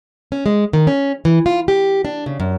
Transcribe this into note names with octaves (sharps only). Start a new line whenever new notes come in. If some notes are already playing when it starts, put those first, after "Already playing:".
C#4
G#3
D#3
C#4
E3
F4
G4
D4
C#3
F#2